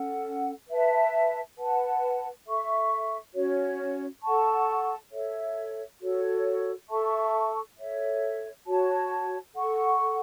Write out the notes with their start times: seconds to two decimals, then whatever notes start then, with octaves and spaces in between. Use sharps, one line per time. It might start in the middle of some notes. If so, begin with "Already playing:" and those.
Already playing: C#4 A4 F#5
0.69 B4 E5 A5
1.57 B4 F#5 A5
2.46 A4 E5 C#6
3.34 C#4 F#4 C#5
4.23 A4 F#5 A5 C#6
5.11 A4 C#5 E5
6.01 F#4 A4 C#5
6.89 A4 E5 A5 C#6
7.77 A4 C#5 E5
8.66 F#4 C#5 A5
9.54 A4 F#5 C#6